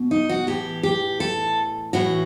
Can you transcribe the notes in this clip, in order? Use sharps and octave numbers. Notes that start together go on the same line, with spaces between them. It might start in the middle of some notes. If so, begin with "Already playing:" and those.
Already playing: B2
D#4
F#4
A2 E3 G4
G4
A4
A2 E3 F#4